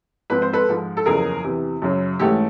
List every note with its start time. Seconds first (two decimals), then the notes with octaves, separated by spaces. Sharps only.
0.30 G#2 F3 G#3 C4 B4
0.42 C5
0.53 A4 B4
0.68 G#2 F3 G#3
0.97 A4
1.06 F#1 E2 C#3 F3 G#4 A#4
1.44 E2 C3 E3
1.82 F#2 C#3 F#3
2.19 G#2 E3 A3 C#4 G4 A4